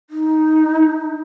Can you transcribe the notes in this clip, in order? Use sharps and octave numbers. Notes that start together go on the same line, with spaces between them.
D#4